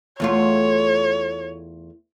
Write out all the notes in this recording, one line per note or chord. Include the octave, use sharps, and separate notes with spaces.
E2 A3 F4 C#5